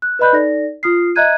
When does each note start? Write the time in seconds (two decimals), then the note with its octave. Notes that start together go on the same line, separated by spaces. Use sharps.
0.02 F#6
0.19 B4 D5 D#5 B5 F#6 G6
0.33 D#4 A4 D5 A#6
0.83 F4 D#6 F6 C7
1.15 D#5 E5 A#5 F#6 G#6 D#7